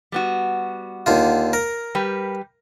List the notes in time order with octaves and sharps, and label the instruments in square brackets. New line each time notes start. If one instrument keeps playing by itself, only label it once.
[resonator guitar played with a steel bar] G3 B3 F#4
[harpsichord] D#2 D3 F4
A#4
[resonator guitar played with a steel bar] G3 G4 B4